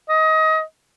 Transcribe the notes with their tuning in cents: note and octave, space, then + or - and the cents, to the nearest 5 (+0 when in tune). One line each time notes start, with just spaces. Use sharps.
D#5 +25